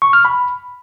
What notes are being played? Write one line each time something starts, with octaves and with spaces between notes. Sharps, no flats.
C#6
F6
B5